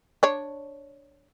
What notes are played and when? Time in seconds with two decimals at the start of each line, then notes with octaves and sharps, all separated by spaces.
0.23 D4 C#5